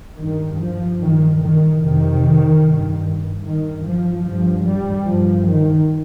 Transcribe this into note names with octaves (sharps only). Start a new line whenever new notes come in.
G2 D#3
F3
G2 D#3
D#3
F2 C3 D#3
G2
G2 D#3
F3
G2 F3
G3
G2 F3
D#3